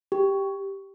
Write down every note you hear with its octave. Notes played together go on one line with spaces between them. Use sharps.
G4